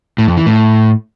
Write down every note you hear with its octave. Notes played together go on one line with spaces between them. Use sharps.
A2
F2
E3
A2